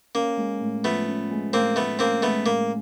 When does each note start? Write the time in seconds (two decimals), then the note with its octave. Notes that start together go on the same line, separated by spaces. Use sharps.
0.15 A#3 C#4
0.38 G#3
0.61 A2
0.84 F3 A3 B3
1.08 C#4
1.30 G#3
1.53 A2 A#3 C4
1.76 F3 A3 B3
1.99 A#3 C4 C#4
2.22 G#3 A3 B3
2.46 A2 A#3